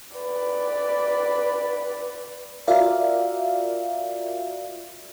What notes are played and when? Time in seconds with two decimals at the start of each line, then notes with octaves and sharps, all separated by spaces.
0.16 B4 D5
2.67 F4 F#4 A#4 D5 E5 F5